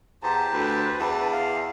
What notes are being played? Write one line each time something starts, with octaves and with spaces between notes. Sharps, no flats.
E2 G4 C5 A5 A#5
D2 B4
E2 E4 D5 A5
F5